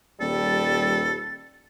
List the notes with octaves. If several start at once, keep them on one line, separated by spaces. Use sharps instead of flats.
D#1 G3 A4 A6